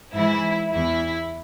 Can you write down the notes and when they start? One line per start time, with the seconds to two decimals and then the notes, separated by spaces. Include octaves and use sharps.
0.13 G#2 E3 E4
0.72 E2 E3 E4